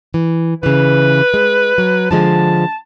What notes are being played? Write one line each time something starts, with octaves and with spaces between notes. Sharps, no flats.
E3
C#3 E3 B4
G#3
F#3
D3 F3 G#3 A5